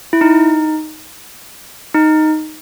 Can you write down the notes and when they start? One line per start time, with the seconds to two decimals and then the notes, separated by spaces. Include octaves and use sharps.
0.13 E4
0.21 D#4
1.94 D#4